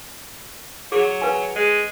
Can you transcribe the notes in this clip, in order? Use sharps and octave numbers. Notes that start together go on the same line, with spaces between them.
F#3 G#4
B4 F5 G#5
G#3